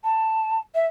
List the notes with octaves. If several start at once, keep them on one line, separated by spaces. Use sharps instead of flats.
A5
E5